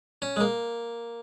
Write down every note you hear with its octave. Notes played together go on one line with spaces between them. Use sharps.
C#4
G#3
A#3